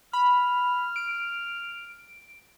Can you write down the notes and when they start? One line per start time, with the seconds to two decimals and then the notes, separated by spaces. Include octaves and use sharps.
0.13 B5 F6
0.96 D7